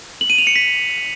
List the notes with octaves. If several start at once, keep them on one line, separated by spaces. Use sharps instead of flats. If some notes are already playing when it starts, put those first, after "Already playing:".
F#7
D#7
F7
C#7
B6